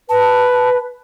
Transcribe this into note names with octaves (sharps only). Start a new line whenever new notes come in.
B4 A5